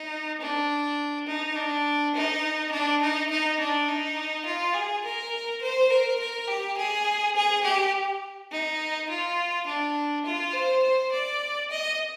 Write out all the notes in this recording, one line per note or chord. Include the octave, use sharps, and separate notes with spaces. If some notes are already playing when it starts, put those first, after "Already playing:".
Already playing: D#4
D4
D#4
D4
D#4
D4
D#4
D#4
D4
D#4
F4
G#4
A#4
C5
A#4
A#4
G4
G#4
G#4
G4
D#4
F4
D4
F4
C5
C5
D5
D#5